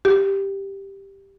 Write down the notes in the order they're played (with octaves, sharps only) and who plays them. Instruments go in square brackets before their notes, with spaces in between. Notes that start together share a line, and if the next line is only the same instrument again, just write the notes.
[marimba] G4